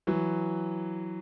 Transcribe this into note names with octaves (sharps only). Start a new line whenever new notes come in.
E3 F#3